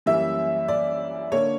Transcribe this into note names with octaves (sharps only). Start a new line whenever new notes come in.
F#2 E3 G3 A#3 C#4 E5
D5
D3 A#3 D4 C#5